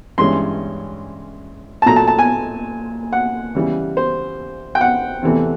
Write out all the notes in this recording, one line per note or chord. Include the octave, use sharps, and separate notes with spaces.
G2 E3 G#3 C#4 C6
A5
A#2 F#3 A3 A#5
A5
A5
G#5
F#5
C#3 E3 G3
C5
G5
F#5
E2 C3 E3 A3